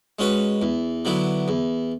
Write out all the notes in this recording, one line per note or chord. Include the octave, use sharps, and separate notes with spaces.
G#3 C#4 F#4 B4
E2
D3 F#3 B3 E4
E2